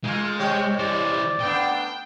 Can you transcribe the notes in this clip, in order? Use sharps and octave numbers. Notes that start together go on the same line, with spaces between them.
G#3 A3 F4 G#5
C3 G3 C#5 G5
E3 C5 D5
A3 B3 D4 G5